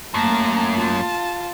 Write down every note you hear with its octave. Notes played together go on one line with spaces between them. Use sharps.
F#2 A3 A#3 A5 A#5
F4 A5